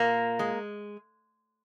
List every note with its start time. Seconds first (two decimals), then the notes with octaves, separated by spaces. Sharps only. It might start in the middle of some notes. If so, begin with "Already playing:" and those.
Already playing: A#2 A#3
0.39 G#3